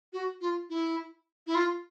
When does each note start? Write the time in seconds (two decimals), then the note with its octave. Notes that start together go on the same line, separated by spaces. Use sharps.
0.13 F#4
0.41 F4
0.70 E4
1.47 E4
1.55 F4